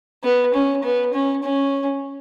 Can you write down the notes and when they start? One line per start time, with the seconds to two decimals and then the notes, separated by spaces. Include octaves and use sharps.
0.24 B3
0.54 C#4
0.84 B3
1.14 C#4
1.43 C#4